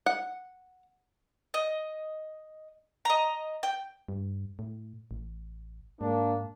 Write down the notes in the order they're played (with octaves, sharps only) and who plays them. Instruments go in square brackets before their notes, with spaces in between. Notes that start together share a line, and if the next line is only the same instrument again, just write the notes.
[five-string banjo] F#5
[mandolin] D#5
D#5 A#5
G5
[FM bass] G2
A2
A1
[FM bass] G#2 [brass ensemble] A#3 D4